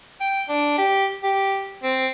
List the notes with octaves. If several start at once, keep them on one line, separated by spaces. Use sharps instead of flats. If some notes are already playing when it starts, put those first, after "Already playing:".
G5
D4
G4
G4
C4